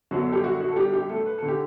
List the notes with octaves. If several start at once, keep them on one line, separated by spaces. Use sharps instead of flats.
F#2 D3 F#3 B3 D4 F#4
A4
G3 G4
F#4
F#4
A4
G3 G4
G3 G4
A3 A4
B4
D3 A4
G4